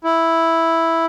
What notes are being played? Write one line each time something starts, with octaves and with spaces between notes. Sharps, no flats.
E4